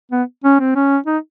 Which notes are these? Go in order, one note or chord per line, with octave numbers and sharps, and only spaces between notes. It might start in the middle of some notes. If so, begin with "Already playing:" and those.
B3
C#4
C4
C#4
D#4